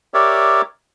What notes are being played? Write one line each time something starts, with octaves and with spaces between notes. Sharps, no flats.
G4 A#4 C#5 D5 E5